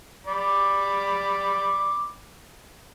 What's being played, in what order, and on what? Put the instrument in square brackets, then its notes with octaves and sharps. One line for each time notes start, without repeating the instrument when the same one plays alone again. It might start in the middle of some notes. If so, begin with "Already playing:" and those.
[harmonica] D5 B5 D6